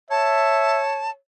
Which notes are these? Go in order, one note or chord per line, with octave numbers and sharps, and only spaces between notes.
C#5 E5 A5